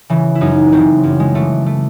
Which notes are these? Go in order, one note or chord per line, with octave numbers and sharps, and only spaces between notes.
C#3 E3
E4
F#2 D#4
C#3 E3 C4
F#2
G#3
C#3 E3 A3
A3